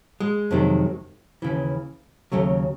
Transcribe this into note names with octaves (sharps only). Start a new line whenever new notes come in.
G#3
F2 C3 D#3 F#3
D#2 C#3 E3
D#2 C#3 F#3 A3